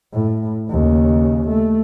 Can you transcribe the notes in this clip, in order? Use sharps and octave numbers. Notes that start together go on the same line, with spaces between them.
A2
D#2 C#3
A3